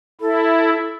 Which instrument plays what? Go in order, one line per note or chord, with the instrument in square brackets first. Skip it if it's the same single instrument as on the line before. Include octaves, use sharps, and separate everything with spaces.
[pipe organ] E4 [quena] A4